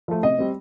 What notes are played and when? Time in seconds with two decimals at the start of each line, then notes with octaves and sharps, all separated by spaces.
0.08 F3 A3
0.23 C3 D#5
0.39 G3 C4